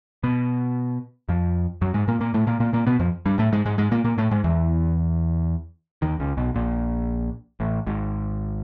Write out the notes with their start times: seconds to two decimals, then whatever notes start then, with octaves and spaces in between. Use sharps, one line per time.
0.23 B2 B3
1.29 F2 F3
1.81 F#2 F#3
1.94 G#2 G#3
2.08 A#2 A#3
2.20 A#2 A#3
2.34 A2 A3
2.47 A#2 A#3
2.60 A#2 A#3
2.73 A#2 A#3
2.87 B2 B3
2.99 F2 F3
3.26 G2 G3
3.39 A2 A3
3.52 G#2 G#3
3.65 G#2 G#3
3.78 G#2 G#3
3.91 A#2 A#3
4.04 A#2 A#3
4.18 A2 A3
4.31 G#2 G#3
4.44 E2 E3
6.02 D#2 D#3
6.20 C#2 C#3
6.37 B1 B2
6.55 A#1 A#2
7.60 A1 A2
7.87 G#1 G#2